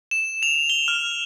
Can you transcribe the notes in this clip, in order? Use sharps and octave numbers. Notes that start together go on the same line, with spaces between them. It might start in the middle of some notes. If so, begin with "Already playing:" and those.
E7
F7
G7
F6